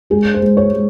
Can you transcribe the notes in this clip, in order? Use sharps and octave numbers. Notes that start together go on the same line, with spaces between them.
G#3 G#4
C5
G#3
C#5
G#3